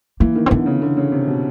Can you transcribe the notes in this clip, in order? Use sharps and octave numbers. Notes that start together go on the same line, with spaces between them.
E3 A#3
D#3
C4
D3 B3
C#3
D3
C#3
C3
B2